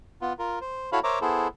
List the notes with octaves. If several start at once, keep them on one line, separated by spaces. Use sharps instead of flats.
B3 F4
F4 A#4
C5
E4 F#4 A4 C#5 F5 B5
A#4 C5 C#5 E5 A#5 D6
B3 E4 G#4 A4 C5